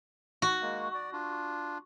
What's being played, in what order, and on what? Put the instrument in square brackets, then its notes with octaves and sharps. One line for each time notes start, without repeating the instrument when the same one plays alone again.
[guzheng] F#4
[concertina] G#3 A#3
D5
D4 F4